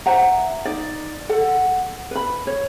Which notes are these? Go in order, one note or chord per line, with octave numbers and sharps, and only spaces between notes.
C5 E5 F#5 A#5
D#4 D5
A4 F#5
B4 B5
C#5